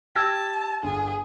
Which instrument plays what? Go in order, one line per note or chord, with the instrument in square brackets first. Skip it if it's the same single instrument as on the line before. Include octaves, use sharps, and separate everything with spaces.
[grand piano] G4 G5 [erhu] A5 [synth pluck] E6 G#6 A#6
[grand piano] G1 D3 [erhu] G#4